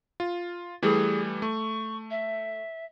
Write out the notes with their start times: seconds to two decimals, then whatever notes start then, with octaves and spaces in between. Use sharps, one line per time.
0.20 F4
0.82 E3 G3 A3 G#4
1.42 A3 C#6
2.10 E5